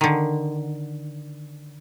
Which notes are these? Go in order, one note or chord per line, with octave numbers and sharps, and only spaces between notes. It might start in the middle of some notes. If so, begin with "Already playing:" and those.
D3 D#3